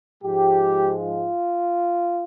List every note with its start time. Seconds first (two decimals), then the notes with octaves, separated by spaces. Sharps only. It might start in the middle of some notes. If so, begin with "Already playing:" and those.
0.23 G#2 F3 G#3 G4
0.99 F4